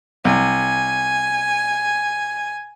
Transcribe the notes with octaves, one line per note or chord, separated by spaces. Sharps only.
C2 G#5